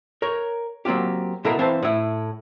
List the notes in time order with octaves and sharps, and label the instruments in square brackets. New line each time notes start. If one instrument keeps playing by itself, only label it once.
[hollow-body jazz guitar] A#4 C#5
F#3 A#3 C4 F4 G4
B2 E4 A4 A#4 F5
E3 C4 E4 C5 F5 A5
A2 E4